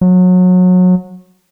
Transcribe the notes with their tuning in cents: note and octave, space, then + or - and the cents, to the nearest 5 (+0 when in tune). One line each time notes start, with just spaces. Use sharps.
F#3 -25